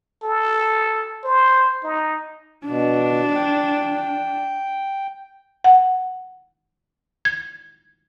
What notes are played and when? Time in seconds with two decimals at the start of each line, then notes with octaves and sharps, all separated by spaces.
0.23 A4
1.24 C5
1.84 D#4
2.67 B2 D4
3.35 G5
5.64 F#5
7.25 G#6